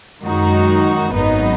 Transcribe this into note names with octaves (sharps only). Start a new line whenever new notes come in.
F#2 D#3 G#3 D#4 F#4
G#1 F#2 F#3 B3 D#4